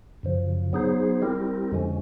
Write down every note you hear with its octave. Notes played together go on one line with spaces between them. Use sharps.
F#2 C#3 F3
F#3 B3 D#4 G#4 C5
G3 C4 E4 G4 A#4
F2 D3 F3 G#3 C#4